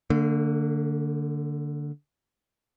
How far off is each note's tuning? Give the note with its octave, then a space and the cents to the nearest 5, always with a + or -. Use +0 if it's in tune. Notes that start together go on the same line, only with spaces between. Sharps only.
D3 +0 A#3 -45